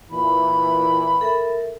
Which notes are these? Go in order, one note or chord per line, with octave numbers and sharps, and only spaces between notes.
A#2 E3 B5
A4 A#4 E5